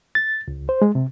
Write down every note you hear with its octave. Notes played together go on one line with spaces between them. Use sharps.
A6
C#2
C5
G#3
C3